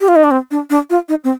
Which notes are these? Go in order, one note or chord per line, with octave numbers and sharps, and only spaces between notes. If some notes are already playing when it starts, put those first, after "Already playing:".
G4
F4
D#4
D4
C4
D4
D4
F4
D#4
C4